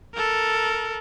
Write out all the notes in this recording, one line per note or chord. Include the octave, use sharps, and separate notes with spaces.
A4 A#4